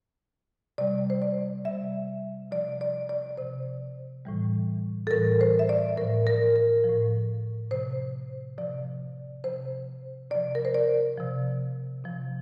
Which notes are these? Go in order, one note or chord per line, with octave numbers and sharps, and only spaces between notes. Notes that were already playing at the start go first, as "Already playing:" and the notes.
C3 G3 D5
C5
D5
C3 G3 E5
C3 F3 D5
D5
D5
C3 F3 C5
A2 E3 G3
A4
A2 E3 G3 A#4
C5
E5
D5
A2 F3 A#4
A#4
A#4
F3
A2
C3 F3 C5
C3 F3 D5
C3 F3 C5
C3 F3 D5
A#4
C5
D5
C3 F3
C3 F3